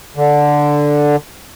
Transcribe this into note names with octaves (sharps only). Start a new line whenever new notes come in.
D3